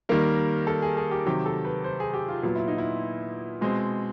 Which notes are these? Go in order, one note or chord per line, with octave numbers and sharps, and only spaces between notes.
D#3 G3 A#3 A#4
A4
G#4
G#4
G4
C3 D#3 F#3 G4
A4
B4
C5
G#4
G4
F4
A#2 F#3 B3 F4
E4
D#4
E4
B2 G#3 C4